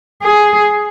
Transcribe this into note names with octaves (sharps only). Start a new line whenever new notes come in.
G#4